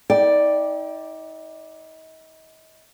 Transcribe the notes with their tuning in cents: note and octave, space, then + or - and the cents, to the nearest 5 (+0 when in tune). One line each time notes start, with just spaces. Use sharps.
D#4 +40 D5 +0 G5 +0